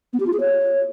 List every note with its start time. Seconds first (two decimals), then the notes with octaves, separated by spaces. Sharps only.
0.13 B3
0.20 G4
0.27 F4
0.33 G#4
0.40 C#5